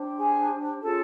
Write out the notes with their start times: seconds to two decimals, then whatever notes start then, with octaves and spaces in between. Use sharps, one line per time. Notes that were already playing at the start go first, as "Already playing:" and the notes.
Already playing: D4 G4 C5
0.18 G#4 G#5
0.82 C#4 F4 G#4 A4 C#5 A5